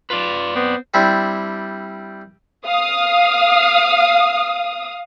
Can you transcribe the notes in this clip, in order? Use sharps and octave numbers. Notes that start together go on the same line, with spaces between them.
F4 B4 D5
B3 C4
G3 C4 D4 E4
F5 D#6